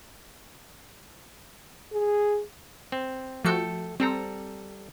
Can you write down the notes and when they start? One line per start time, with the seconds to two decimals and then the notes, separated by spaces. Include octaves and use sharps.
1.93 G#4
2.92 C4
3.45 F3 A3 F#4 A4 G5 C#7
4.00 G3 C4 A4 A#5